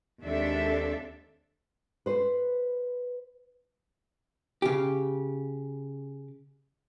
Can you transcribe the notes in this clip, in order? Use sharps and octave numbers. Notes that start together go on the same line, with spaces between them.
D#2 G#3 C4 D4 A4 E5
B4 C5
C#3 G4